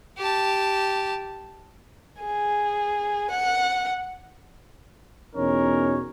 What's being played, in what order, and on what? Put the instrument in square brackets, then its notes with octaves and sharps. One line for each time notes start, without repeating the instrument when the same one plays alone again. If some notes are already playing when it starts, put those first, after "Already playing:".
[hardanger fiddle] G4 A5
[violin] G#4
F#5
[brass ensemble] E2 B2 C#4 D#4 A#4 C#5